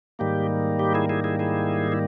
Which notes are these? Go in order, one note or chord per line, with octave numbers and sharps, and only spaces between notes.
G#2 D#3 G3 A#3 G4
G4
E4 G#4
E4 G#4
E4 G#4
E4 G#4
E4